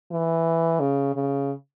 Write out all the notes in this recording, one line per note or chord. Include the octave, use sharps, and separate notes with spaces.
E3
C#3
C#3